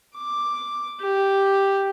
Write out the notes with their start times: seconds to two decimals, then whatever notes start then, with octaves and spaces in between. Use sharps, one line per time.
0.15 D6
1.01 G4